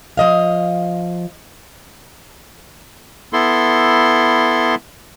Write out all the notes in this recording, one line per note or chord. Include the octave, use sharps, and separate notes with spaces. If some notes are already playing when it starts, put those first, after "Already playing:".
F3 D#5 F5
B3 E4 A4 C6